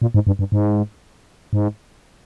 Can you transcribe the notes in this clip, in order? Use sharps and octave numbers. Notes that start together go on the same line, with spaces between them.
A#2
G#2
G2
G2
G#2
G#2